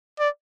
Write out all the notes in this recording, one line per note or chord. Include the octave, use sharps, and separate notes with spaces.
D5